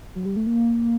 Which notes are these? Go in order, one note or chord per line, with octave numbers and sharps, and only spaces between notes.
F#3
G3
A3
A#3